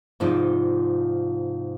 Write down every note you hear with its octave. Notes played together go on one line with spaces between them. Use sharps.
G#2 C3 F3 D#4 D5